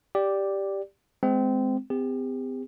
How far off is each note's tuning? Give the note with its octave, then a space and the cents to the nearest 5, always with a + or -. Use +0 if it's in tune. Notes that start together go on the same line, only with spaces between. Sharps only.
G4 +0 D5 -5
G#3 +10 C4 -20
C4 -40 G4 +40